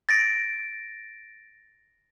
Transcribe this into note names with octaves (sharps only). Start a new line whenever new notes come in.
A6 A#6 D7